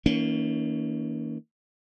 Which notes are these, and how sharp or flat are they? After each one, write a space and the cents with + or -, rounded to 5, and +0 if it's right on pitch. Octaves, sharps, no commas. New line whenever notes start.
D#3 +45 A#3 -20 C#4 +20